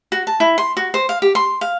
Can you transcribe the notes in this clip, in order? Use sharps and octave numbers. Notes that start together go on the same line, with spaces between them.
F#4
A5
E4
C6
F#4
C5
F5
G4
C6
F5